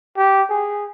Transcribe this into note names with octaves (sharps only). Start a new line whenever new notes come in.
G4
G#4